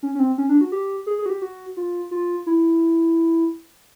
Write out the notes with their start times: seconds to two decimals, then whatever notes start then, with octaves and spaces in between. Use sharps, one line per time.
0.03 C#4
0.15 C#4
0.19 C4
0.38 C#4
0.49 D4
0.61 F#4
0.72 G4
1.07 G#4
1.19 G#4
1.26 F#4
1.30 G4
1.42 F#4
1.77 F4
2.11 F4
2.46 E4